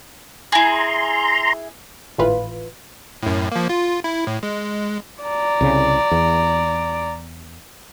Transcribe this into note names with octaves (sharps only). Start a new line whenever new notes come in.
E4 G#4 A#5 C6
G#1 A2 E3 F4 B4
F#2 A2
F3 A#3
F4
E4
A2
G#3
D5 A#5
C2 C#3
E2